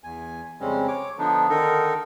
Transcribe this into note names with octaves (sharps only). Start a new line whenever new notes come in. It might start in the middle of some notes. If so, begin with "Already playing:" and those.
E2 G#5
F2 C#3 G3 G#3 C4 C#4
C#5 D6
D3 F3 B3 D4 D#4
D3 D#3 D#4 A4 A#4